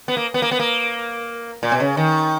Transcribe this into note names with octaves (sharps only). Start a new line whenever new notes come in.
B3
A#3
B3
A#3
B3
A#3
A#2
B2
C#3
D#3